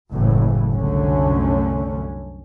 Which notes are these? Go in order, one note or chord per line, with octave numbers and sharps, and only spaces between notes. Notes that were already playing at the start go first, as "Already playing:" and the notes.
F#1 A2 E3
C2 F#2 D3 A3 C#4